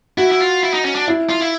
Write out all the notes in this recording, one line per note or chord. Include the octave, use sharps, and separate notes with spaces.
E4 F#4
E4
F4
E4
D#4
C#4
D4
E4
F4
E4